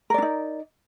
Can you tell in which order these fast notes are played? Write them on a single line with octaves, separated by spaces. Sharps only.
A#4 D5 D4 D#4